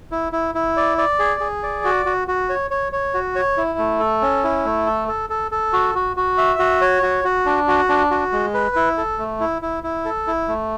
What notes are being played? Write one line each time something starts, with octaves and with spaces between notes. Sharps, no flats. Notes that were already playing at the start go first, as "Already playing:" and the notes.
E4
E4
E4
D5
D5
G#4
G#4
D5
F#4
F#4
F#4
C#5
C#5
C#5
F#4
C#5
E4
A3
A4
C#4
E4
A3
A4
A4
A4
A4
F#4
F#4
F#4
E5
F#4
C#5
F#4
F#4
D4
F#4
D4
F#4
G#3
B4
E4
A4
A3
E4
E4
E4
A4
E4
A3